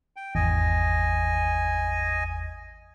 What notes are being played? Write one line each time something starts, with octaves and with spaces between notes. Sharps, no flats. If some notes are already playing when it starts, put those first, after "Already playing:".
G5
G#1 E2 D#5 G#5